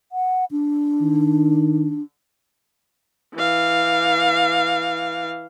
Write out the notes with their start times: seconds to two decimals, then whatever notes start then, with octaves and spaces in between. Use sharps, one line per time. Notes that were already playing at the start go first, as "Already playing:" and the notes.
0.12 F#5
0.51 D4
1.01 D#3
3.35 E3 F5